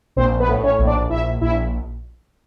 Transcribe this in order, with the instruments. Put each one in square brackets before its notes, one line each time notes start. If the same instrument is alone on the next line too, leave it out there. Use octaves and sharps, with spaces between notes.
[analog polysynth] A#1 C4 C5
B3 B4
A2
C#4 C#5
A#1
D4 D5
A#1 E4 E5
A#1 E4 E5